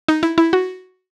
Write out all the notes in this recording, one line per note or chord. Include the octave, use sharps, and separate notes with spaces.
D#4
E4
E4
F#4